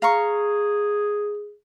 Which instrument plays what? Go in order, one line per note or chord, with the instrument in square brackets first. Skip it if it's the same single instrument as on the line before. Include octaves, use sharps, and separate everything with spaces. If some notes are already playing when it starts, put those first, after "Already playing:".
[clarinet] G#4 [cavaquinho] F5 A#5 C#6